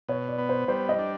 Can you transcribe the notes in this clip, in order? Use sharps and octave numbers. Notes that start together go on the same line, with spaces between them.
B2 C#5
D5
B3
C5
G3 C5
D#5
D4